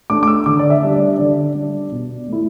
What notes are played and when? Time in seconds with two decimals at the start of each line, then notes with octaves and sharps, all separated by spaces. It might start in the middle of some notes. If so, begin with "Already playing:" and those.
0.10 A3 D4 D6
0.23 D6
0.27 E6
0.46 D3 D6
0.59 D5
0.70 E5
0.83 G3 D4
0.94 D5
1.18 D3 D5
1.55 G3 D4
1.92 B2
2.28 A3 E4